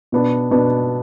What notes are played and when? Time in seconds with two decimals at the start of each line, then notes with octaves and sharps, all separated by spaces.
0.12 B2 B3 D4
0.51 B2 B3 D4